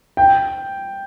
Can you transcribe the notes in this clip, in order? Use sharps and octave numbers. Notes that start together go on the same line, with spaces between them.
G5